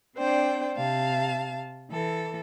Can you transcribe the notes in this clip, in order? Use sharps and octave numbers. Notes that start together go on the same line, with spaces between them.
C4 D4 C5 D5 G5
C3 F5 A5
E3 A4